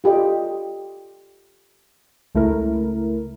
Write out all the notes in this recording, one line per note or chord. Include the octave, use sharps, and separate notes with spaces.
F4 G4 A4 D#5
C#2 A3 E4 A#4